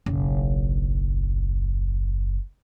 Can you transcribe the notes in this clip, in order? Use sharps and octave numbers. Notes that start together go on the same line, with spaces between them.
F#1 B1